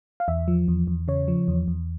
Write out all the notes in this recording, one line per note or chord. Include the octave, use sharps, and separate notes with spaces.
F5
E2 E5
F3
E2
E2
C#3 C#5
F3
E2
E2